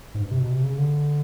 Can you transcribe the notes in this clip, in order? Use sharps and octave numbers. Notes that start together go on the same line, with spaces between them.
G#2
G2
C3
B2
C3
C#3
D3